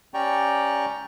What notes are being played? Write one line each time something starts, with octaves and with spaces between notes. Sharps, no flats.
C#4 G4 D5 G5 A#5 C#6